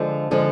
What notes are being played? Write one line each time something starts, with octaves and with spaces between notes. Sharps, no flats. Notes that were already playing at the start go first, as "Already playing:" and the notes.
Already playing: D3 F3 G#3
D3 F3 G#3